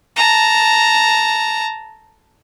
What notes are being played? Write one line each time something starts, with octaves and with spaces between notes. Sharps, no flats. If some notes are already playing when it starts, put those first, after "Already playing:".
A5 A#5